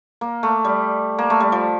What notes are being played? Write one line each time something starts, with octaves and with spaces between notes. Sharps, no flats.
A#3
A3
G3
A#3
A3
G3
F3